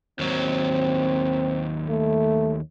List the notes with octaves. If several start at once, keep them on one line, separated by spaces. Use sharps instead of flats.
D#2 F#3 C4
A3